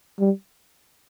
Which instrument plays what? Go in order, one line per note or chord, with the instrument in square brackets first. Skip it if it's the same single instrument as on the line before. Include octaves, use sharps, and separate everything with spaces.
[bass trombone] G3